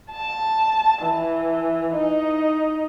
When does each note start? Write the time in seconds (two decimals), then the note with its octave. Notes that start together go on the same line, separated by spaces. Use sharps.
0.11 A5
1.02 E3
1.95 D#4